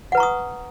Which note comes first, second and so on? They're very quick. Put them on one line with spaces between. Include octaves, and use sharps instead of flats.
F#5 B4 A#5 C#6 D#6